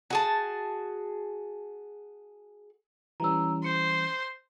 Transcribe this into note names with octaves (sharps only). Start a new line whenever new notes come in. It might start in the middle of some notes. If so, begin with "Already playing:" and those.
F#4 G#4 A5
E3 G3 C#4 A#5 E6
C5 C#7